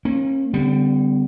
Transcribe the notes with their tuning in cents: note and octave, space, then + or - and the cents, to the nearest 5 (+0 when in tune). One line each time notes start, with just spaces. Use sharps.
A#3 +0 C#4 -40
D3 -25 G3 +0 B3 +45